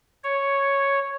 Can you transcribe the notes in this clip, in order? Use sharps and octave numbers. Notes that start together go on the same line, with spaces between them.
C#5